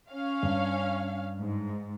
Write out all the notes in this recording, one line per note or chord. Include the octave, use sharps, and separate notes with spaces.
C#4 F5
G2
G#2